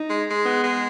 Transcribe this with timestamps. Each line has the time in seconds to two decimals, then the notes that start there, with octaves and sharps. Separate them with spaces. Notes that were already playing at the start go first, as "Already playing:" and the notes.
Already playing: D#4
0.10 G#3
0.28 G#3
0.46 B3
0.63 G#3